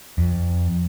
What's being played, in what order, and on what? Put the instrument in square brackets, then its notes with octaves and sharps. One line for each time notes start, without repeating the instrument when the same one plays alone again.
[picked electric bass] F2